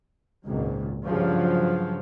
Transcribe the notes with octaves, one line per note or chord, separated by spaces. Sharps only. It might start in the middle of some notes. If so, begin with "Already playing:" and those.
G#1 C#2 A#2
G2 C#3 F3 F#3